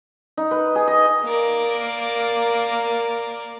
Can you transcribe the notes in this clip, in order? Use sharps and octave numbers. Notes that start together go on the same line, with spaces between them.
D#4
B4
G#4
D#5
A#3 A#4 D5